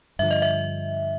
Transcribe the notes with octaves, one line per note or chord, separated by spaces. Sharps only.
G2 D3 F3 E5
D#5
E5